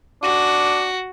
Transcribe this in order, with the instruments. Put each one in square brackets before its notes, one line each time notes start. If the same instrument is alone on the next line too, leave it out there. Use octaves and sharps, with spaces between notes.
[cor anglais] D4 [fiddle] F#4